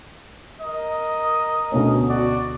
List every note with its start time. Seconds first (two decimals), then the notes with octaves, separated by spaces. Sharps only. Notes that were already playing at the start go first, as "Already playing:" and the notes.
0.62 A#4 D#5
1.72 D2 B2 C#4
2.09 F#4 D5